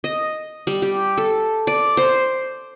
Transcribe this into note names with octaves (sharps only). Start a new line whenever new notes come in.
D#5
G3
G4
A4
D5
C5